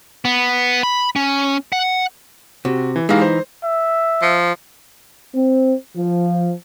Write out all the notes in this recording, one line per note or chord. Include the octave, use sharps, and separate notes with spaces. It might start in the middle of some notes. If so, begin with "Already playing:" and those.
B3
B5
C#4
F#5
C3 F#4
E3
E3 G#3 D#4 G4 F5
C5
E5
F3
C4
F3